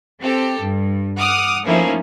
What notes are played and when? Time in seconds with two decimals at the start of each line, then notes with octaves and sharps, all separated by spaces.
0.20 C4 G4 A4
0.61 G2
1.17 F#5 D6 D#6 F6
1.65 F3 A3 A#3 C#4 D#4 E4